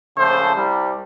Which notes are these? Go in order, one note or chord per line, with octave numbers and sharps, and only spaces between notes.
A#1 C#3 F3 A3 C5
C2 G3